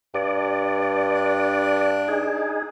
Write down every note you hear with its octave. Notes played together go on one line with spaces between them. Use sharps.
G2 D5
D4
D#4 G#4